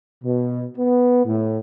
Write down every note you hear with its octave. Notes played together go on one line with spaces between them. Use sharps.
B2
B3
A2